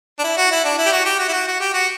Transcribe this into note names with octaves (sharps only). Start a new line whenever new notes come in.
D4
E4
F#4
E4
D4
E4
G4
F#4
G4
F#4
E4
F#4
F#4
G4
F#4